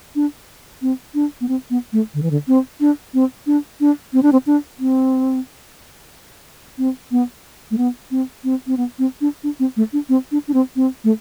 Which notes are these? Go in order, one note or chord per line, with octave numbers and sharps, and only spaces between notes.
D4
C4
D4
B3
C4
B3
A3
D3
E3
D3
C4
D4
C4
D4
D4
C4
D4
C4
D4
C4
C4
B3
A3
B3
C4
C4
C4
B3
C4
D4
D4
C4
A3
D4
C4
D4
D4
C4
C4
A3